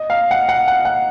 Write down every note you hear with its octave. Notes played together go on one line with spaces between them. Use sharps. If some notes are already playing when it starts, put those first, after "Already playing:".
Already playing: D#5
F5
F#5
F#5
F#5
F#5